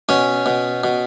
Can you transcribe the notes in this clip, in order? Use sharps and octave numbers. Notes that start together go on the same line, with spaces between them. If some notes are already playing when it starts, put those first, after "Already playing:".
B2 C#4
B2
B2